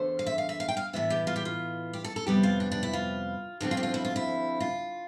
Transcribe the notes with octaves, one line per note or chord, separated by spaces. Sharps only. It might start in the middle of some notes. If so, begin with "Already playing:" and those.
Already playing: E2 D3 A3 C5
F5
E5
F5
E5
F5
G5
F5
A2 E3 B3 E5
G4
F4
G4
F4
G4
A4
A4
F2 C3 G3 B3 G4
F4
D4
D4
E4
F4
D2 D3 F3 C4 F4
F4
G4
F4
E4
F4
E4
F4